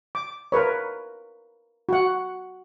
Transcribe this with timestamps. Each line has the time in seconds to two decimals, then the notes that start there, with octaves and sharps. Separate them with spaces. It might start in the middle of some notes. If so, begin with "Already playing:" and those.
0.15 D6
0.52 A#4 B4 C#5
1.89 F#4 F#5